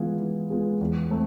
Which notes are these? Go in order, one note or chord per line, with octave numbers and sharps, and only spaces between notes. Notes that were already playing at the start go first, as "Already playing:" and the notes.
Already playing: E3 G#3 B3 F4 G#4
E3
G#3 B3 F4 G#4
E2
A3 C4